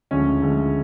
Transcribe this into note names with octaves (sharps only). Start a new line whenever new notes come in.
D2 C#3 F3 G#3 C#4
D2 C#3 F3 G#3